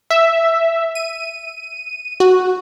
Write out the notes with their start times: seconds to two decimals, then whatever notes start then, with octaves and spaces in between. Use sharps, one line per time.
0.10 E5
0.95 D#7
2.20 F#4